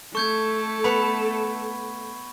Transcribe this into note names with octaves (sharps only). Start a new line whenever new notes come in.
A3 A4 C#6 G6 G#6
B3 B4 B5